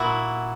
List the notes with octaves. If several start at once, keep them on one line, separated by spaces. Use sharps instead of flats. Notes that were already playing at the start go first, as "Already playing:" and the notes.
Already playing: A#2 E4 F#4